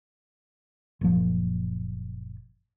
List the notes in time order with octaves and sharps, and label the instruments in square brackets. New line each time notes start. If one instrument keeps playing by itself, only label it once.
[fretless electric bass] F#1 A#2 F3